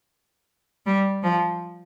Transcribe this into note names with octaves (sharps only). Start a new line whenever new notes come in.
G3
F3